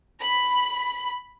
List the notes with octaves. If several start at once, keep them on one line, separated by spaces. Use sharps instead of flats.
B5